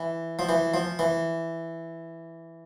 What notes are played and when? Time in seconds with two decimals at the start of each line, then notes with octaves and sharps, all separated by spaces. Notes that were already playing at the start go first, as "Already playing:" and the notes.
Already playing: E3
0.39 F3
0.49 E3
0.74 F3
0.99 E3